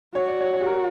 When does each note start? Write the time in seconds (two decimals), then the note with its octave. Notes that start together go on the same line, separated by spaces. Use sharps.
0.15 F#4 C#5
0.28 D5
0.41 C#5
0.53 C#5
0.61 G4
0.66 A#4